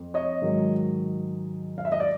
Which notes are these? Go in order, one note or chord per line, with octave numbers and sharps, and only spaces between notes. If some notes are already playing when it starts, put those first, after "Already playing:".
Already playing: F2
C#5 D#5
G#2 D#3 F#3
F5
E5
D#5
D5